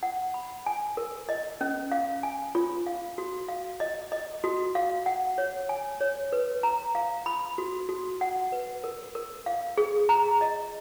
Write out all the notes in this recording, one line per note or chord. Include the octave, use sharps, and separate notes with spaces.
F#5
B5
G#5
A#4
D#5
C#4
F5
G#5
F4
F5
F#4
F5
D#5
D#5
F#4
F5
F#5
C#5
G#5
C#5
B4
A#5
F5
B5
F#4
F#4
F#5
B4
A#4
A#4
F5
G#4
A#5
D#5